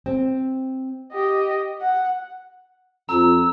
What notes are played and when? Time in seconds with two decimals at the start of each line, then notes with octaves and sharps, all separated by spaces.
0.06 C4
1.13 G4 D#5
1.81 F#5
3.09 F2 A#5 E6